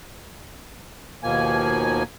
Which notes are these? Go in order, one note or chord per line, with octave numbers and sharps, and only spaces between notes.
D#2 B2 F3 A#3 G#5